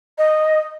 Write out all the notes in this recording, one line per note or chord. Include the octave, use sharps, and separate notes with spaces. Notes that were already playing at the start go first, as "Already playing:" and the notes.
D#5